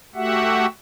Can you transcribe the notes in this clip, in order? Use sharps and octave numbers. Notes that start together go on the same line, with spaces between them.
A3 F#4 G4 E5 F#5